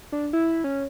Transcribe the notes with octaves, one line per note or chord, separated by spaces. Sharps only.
D4
E4
C#4